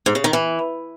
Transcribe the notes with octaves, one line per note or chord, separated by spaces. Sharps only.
G#2
C#3
D#3
E3